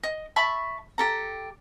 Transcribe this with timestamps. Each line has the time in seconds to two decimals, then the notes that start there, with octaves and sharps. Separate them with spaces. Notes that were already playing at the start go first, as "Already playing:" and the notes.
0.03 D#5
0.36 E5 A5 B5 C#6
0.98 G4 A4 A#5